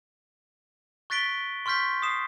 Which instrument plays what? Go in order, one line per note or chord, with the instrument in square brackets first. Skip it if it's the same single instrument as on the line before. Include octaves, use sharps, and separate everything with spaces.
[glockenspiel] C#6 F#6 A6 B6 D7 G7
C6 C#6 F6 G6 B6
D#6 C7 E7